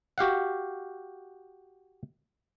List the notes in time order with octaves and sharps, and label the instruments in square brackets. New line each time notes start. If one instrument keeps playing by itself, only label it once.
[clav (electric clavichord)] F#4 G4 F5 F#5